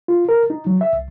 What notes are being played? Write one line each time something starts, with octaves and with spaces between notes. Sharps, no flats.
F4
A#4
D#4
F#3
E5
C2